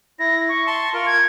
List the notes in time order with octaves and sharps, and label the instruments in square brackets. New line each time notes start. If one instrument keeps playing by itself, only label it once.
[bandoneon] E4 [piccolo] A#6
[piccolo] C#6
[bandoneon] A5 C6
F4 A#4
[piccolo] G#6